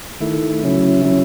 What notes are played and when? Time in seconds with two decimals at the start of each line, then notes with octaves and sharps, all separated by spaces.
0.20 D#3 A3 E4
0.63 C#3 F#3 C#4 E4
1.05 C#3 F#3 C#4 E4